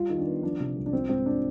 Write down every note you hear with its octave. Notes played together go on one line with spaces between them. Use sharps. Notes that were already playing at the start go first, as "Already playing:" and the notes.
Already playing: G3 F4
D#3
D4
B3
F3 D4
C3
C2
D4
F3 C4
G#2 C4
G#3 D4